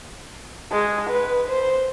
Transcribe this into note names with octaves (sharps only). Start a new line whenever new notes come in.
G#3
B4
C5